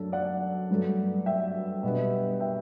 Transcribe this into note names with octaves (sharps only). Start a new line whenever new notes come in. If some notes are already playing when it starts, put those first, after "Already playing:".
Already playing: F#2 F#3 A3 D4 A4
D5 F#5
G2 F#3 A3
E5 G5
B2 G3 B3 D4
E5 G5